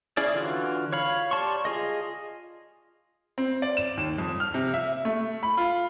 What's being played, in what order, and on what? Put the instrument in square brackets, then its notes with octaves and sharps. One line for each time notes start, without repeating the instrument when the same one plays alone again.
[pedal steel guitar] C#4 E4 G#4 D5
D3 E3 F4 F#4
C#5 F5 B5
G4 D5 A5 C6 C#6
F4 G#4 D#5
[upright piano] C4
D5
E7
D#2
F2
F6
C3
E5
E5
A3
B5
F4